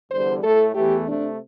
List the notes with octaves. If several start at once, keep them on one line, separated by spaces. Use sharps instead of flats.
E2 D3 G3 C5
A2 A3 A4
E2 E3 A3 G4
C3 A3 D4